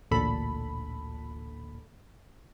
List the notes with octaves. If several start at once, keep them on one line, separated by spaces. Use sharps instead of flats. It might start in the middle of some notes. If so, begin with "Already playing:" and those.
A1 D2 A#2 A4 B5